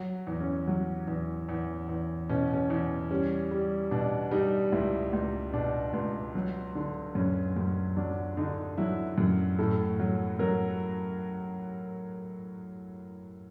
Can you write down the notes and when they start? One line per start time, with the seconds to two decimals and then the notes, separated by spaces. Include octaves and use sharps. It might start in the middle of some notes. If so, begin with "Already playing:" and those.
Already playing: F#3
0.27 E2
0.40 C#4
0.67 F#3
1.08 E2
1.49 E2
1.89 E2
2.29 B2 C#4
2.54 C#4
2.70 E2
3.11 G3 C#4
3.51 G3
3.91 B2 D4
4.31 G3 D#4
4.72 C#2 E4
5.13 C#2
5.53 B2 D4
5.93 C#2
6.35 F#3
6.75 D3
7.15 F#2 C#4
7.57 F#2
7.97 F#3 D4
8.37 D3 D#4
8.77 F#3 E4
9.18 F#2
9.59 A2 A4
10.00 F#3
10.39 F#3 A#4